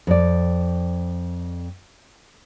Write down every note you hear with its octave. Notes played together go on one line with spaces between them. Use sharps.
F2 D5